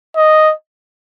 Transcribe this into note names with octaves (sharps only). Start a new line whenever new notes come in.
D#5